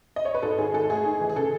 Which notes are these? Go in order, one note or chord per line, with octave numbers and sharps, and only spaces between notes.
D#5
C#5
B4
G#2 A4
D#3 G#4
G#2 A4
A3 G#4
D#4
E3
G#4
C#3 A4